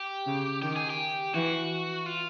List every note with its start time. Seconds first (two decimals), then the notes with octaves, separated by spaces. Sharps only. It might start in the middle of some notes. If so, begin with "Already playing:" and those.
Already playing: G4
0.26 C#3
0.62 D#3 G4
0.76 G#4
0.90 G4
1.35 E3 F#4
2.06 F4